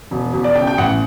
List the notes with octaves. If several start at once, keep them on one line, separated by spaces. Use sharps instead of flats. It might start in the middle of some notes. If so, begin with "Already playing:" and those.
E1
E1
D5
C#3 G5
G5
A1 F#5